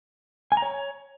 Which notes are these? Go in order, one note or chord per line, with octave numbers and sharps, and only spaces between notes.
G#5
A#5
C#5